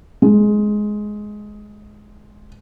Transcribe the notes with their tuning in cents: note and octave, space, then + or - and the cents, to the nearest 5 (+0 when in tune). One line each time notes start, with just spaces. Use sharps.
G#3 +10